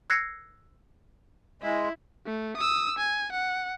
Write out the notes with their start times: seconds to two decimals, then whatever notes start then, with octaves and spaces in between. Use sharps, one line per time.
0.10 E6 F#6 G#6 A#6 C7 C#7
1.62 G#3 E4
2.26 A3
2.57 D#6 E6
2.98 G#5
3.32 F#5